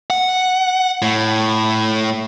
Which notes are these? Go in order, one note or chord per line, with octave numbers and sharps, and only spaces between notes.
F#5
A2